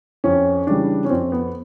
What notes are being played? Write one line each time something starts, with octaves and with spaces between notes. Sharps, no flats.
F2 C#4
C#3 E3 G3 D4
C#4
F2 C4
B3